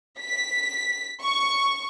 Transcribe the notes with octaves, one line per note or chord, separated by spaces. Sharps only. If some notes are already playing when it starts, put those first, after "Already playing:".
B6
C#6